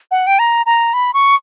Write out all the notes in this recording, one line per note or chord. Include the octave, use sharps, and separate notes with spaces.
F#5
G5
A#5
A#5
B5
C#6